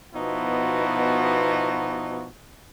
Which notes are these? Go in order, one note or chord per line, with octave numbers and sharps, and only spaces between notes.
B2 F3 B3 D#4 E4 F#4